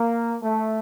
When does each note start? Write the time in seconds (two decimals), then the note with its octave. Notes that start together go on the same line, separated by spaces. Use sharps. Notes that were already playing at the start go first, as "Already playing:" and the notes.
Already playing: A#3
0.42 A3